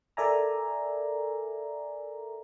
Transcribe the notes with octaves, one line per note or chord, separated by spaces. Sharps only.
A4 A#4 D5 E5 G#5 A#5